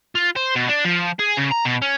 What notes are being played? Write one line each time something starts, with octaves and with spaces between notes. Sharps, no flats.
F4
C5
B2
D4
F3
G#4
C#3
A#5
B2
C#4